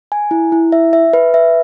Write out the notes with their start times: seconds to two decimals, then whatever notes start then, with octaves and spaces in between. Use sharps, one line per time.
0.12 G#5
0.31 E4
0.52 E4
0.72 E5
0.93 E5
1.13 B4
1.34 E5